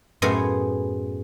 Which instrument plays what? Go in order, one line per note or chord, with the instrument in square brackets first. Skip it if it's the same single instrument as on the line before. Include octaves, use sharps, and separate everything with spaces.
[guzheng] F#2 A2 B3 G#4 C5